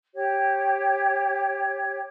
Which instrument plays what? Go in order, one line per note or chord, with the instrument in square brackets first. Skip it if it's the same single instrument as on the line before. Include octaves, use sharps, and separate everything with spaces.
[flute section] G4 C#5